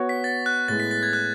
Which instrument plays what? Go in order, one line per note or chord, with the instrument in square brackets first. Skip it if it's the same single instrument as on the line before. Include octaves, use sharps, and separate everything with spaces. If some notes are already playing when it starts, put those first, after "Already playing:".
Already playing: [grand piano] B3 F#4 C#5
[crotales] B6
A6
F#6
[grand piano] A2 G#3 B3 [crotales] A6
[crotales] B6
A6
G#6
F#6